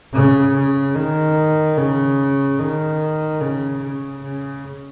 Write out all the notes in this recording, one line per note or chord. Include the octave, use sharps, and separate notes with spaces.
C#3
C#3
D#3
C#3
D#3
C#3
C#3
C#3